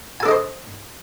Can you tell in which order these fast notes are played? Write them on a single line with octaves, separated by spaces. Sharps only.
G#5 A4 D4 D#5 C5